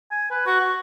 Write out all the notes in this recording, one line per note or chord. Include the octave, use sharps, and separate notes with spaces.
G#5
B4
F#4 C#6
F#4